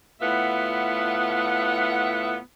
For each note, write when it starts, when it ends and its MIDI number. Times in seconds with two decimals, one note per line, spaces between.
0.21 2.37 45
0.21 2.37 59
0.21 2.37 65
0.21 2.37 76
0.21 2.37 78